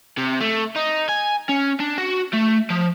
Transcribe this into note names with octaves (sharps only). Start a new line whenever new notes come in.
C3
A3
D#4
G#5
C#4
D4
F#4
A3
F3